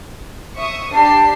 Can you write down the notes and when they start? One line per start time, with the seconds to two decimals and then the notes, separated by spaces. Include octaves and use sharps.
0.57 E5 C#6 D#6
0.93 D4 G4 A5 C7